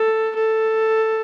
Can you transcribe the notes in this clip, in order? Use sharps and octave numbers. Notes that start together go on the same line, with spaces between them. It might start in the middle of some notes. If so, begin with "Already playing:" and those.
Already playing: A4
A4